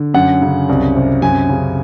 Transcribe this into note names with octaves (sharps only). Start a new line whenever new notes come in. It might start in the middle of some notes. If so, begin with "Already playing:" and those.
Already playing: D3
F#2 F#5
C#3
C2
C3
F#2 G#5
C#3